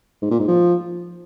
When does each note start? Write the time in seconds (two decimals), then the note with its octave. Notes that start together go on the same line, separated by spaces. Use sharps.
0.22 G#2
0.30 A#2
0.39 G#2
0.48 F3